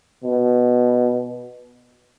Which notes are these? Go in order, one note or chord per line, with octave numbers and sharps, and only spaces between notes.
B2